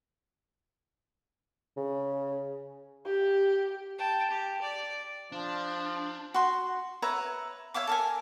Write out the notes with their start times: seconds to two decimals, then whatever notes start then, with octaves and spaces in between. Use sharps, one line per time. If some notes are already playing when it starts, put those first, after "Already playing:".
1.77 C#3
3.05 G4
3.98 G5 A5
4.31 G4
4.62 D5
5.32 F3 D4
6.34 F#4 C6
7.02 B4 C#5 E5 A#5
7.74 C#5 E5 F5 D6
7.87 A4 A#4 G#5